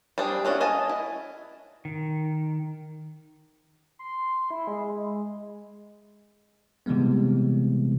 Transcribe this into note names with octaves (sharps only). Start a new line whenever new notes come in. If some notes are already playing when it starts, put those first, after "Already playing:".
G3 C4 D4 G#4
A3 C#4 D4 F#4
D#5 G#5 A5
E4
D#3
C6
E4
G#3
C3 E3 G3 G#3 B3